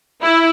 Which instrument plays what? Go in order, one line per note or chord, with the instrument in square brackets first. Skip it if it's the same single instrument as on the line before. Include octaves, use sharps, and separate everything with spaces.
[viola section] E4